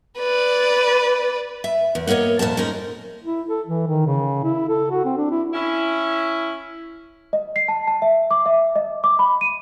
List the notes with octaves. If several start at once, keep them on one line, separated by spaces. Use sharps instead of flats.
B4 D5
E5
E2
A#3 B3 A#4 C#5 D#5
F2 A#2 A#4 A5
G#3 C#4 D#4 A#4
E4
A4
E3
D#3
C#3
E4
A4
F#4
C4
D4
E4
C#4 E4
D#5
C7
A5
A5
E5
D6
E5
D#5
D6
B5
D#7